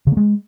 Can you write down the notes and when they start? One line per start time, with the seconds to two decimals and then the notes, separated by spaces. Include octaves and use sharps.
0.07 C#3
0.12 A#3
0.17 G#3